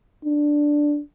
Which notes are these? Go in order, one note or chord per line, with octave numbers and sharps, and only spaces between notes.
D4